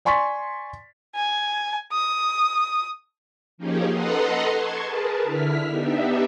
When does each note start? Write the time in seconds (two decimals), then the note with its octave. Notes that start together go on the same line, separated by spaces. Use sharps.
0.05 D5 G#5 C6 C#6 A6 B6
1.16 G#5
1.93 D#6
3.58 F3 A#3 C#4 D#4 G4 G#4
3.91 A4 B4 D#5 F#5 A#5 C6
4.51 A5 C6 C#6 G#6
4.83 G#4 A#4 B4 A5
5.23 D3 E4 F6 B6
5.68 B3 D4 D#4 G4 E5